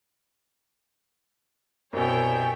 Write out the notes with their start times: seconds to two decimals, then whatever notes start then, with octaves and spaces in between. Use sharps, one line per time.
1.93 C2 F#2 B2 C#5 E5 G5 G#5